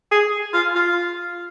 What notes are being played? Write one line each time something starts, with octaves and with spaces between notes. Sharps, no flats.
G#4
F4
F4